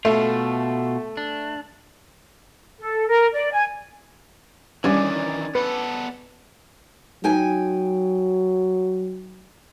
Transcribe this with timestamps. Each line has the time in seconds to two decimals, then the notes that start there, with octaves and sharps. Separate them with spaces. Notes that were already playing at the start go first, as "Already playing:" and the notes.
0.05 B2 A3 F4
1.17 D4
2.78 A4
3.07 A#4
3.33 D5
3.52 G#5
4.84 G2 D#3 E3 C#4 D4 D5 G#5
5.55 B3 A4 B4
7.24 F#3 D#4 G5 G#5